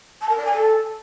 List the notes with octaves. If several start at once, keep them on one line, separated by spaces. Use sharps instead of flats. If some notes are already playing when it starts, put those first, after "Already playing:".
A5
A#4
D5
G#5
A4